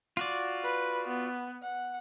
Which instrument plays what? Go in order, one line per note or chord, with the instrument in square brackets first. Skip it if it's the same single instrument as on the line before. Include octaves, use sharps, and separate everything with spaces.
[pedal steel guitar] F4 F#4 D5
[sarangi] B4
B3
F#5